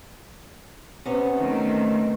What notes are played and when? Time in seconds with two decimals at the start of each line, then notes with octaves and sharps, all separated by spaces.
1.06 C3 B3 C#4
1.38 D#3 A3 C4